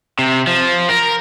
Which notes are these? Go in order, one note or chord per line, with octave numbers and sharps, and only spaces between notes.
C3
F3
A#4